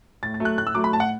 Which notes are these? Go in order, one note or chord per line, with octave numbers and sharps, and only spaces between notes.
A2 A6
A6
F#3 A3
F#6
A2 F#6
E6
F#3 A3 D6
B5
A2 A5
F#5